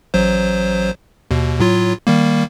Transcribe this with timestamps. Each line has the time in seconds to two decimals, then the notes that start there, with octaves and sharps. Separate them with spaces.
0.14 A1 F#3 C5
1.31 D#2 B2
1.60 A2 F#3 F4
2.07 D#3 G3 A#3